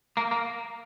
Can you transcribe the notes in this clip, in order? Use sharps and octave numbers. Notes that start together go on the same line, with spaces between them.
A#3
A#3